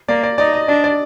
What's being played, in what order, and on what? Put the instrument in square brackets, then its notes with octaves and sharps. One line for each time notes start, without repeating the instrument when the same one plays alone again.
[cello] A#3 [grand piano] D5
[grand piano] D5
[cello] D#4 [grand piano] D5
[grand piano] D#5
[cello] D4 [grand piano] D5
[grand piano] D5